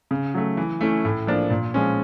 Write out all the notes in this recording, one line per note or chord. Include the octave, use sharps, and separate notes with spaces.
C#3
F#3 A3
E3
A3 C#4 E4
A2
F3 A#3 D4
A#2
F3 G#3 C#4